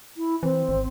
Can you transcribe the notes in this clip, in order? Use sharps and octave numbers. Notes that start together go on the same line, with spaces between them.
E4
E3 C4
G#1